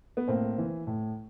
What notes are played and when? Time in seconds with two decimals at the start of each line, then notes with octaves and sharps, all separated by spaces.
0.17 B3
0.28 A2 A#3 C4
0.58 E3
0.87 A2